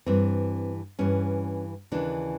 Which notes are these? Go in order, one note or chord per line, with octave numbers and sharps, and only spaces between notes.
G2 E3 C4
G2 E3 C#4
D#2 C#3 E3 D4